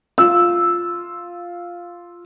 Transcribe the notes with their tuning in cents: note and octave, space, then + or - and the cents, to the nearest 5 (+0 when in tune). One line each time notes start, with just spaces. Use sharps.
F4 +0 E6 -5